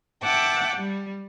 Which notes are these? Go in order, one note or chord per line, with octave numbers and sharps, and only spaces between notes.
E5 F#5 G5 A5 D6
G3